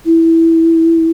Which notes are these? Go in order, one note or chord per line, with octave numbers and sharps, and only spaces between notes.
E4